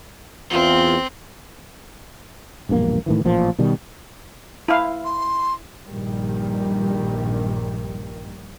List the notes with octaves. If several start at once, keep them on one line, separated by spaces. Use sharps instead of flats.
E2 C4 F4
E1 A#1 G2 A#3
A2 D#3 E3
A1 A#2 F3
B2 D#3 G3
E4 F5
C6
A#1 G2 A#2 D#3 G3